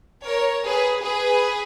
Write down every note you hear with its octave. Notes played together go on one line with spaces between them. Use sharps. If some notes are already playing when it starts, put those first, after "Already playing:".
A#4 C#5
G#4 B4
G#4 B4